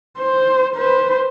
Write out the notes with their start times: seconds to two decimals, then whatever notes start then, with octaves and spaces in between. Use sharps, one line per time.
0.18 C5
0.75 B4 C5